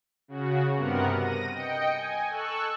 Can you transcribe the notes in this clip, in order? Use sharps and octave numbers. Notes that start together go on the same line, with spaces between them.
C#3 F#4
G2 C3 B3 A#4 F#5
A#6 D#7
D#5 G5 C#7
G#5
A4 C#6 E6 F#6